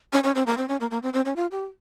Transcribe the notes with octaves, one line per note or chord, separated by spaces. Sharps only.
C#4
C#4
C4
A#3
C4
C#4
A#3
A#3
C4
C4
C#4
F4
G4